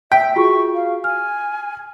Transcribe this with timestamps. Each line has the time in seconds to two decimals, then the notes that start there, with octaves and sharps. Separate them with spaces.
0.12 E5 G5 B6
0.36 F4 F#4 G#4 C#6
0.74 F5
1.04 G#5 F6